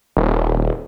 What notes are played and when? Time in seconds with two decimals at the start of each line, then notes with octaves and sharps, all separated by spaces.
0.17 D#1